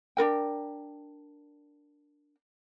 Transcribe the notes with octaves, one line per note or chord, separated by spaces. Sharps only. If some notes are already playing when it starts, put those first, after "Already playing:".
D4 F4 A#4 G5